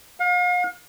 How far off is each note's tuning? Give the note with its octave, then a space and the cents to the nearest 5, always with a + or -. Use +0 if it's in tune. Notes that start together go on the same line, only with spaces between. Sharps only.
F5 +40